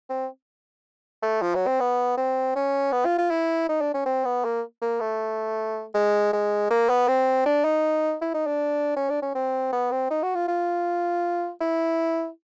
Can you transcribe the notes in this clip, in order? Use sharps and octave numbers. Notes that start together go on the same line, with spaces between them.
C4
A3
F3
F#3
C4
B3
C4
C#4
B3
F4
F4
E4
D#4
D4
C#4
C4
B3
A#3
A#3
A3
G#3
G#3
A#3
B3
C4
D4
D#4
E4
D#4
D4
C#4
D4
C#4
C4
B3
C4
D#4
F#4
F4
F4
E4